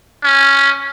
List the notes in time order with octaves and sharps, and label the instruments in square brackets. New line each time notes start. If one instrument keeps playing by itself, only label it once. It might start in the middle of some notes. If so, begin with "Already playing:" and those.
[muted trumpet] C#4